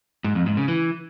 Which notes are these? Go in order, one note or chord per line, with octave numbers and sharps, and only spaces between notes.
G#2
F2
G#2
C#3
E3